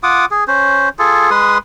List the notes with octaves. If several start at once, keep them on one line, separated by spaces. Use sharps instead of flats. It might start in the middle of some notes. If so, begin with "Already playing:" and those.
F4 F#5 D6 D#6
G#4
C#4 C5
F4 G#4 A4
G#3 B4 C6 D#6